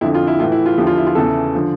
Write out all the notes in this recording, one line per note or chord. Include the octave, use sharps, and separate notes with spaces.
F2 D3 F3 E4
F4
E4
A2 E3 F4
E4
F4
E2 D3 F3 G4
F4
E4
F4
E2 C#3 E3 A4
D3 F3